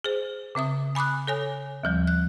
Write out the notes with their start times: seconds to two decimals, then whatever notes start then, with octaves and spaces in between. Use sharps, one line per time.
0.04 G#4 C5
0.55 C#3 C4 E5 D#6
0.95 G#5 B5 D6 D#6 F#6
1.27 A4 C#5 G#5
1.84 D#2 F3 G3
2.07 F#6